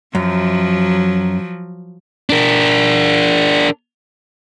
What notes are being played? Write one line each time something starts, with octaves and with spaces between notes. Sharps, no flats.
F#2 F3 F#3
D4 A#4